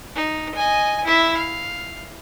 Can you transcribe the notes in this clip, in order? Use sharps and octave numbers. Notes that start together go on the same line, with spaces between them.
D#4
D#5 G#5
E4 E5
F5